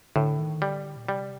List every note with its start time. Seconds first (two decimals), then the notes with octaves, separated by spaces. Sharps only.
0.16 A2 D3
0.39 D#3
0.62 D3 G3
0.97 A#2
1.08 C3 G3